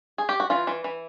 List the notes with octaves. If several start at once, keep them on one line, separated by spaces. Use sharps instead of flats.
G#4
G4
F#4
E3 F4
E3
E3